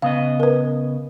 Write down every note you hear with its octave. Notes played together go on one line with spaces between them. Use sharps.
C#3 B3 D#5 F5
A#4 B4